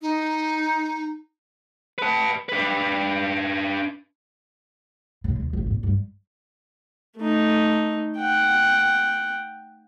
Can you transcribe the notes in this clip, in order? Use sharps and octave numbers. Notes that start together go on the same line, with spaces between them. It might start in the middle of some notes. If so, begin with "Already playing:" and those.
D#4
B4 A5
D4 B4
C#3
D#2
G#1
A#2
G2
A3 D#4
F#5 G5